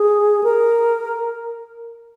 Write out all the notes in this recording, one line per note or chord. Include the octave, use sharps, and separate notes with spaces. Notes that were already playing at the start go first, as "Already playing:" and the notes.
Already playing: G#4
A#4